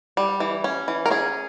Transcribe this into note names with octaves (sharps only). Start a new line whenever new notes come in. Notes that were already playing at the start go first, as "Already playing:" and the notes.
G3
E3
C#4
E3
A#4
C#4 G#4